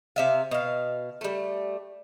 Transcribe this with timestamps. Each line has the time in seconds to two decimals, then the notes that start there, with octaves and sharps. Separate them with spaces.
0.16 C3 E5 F5
0.51 B2 F5
1.21 G3 A3